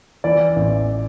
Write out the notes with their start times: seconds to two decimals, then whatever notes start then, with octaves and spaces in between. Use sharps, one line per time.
0.24 E3 D5
0.56 A1